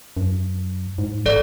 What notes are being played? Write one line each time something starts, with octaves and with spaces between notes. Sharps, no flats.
F#2
G#2
A1 A4 D5